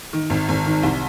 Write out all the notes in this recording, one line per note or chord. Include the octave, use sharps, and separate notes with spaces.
D#3
G#1
G#1
D#3
C2